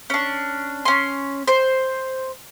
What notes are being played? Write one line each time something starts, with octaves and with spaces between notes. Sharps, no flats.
C#4 D4
C#4 C6
C5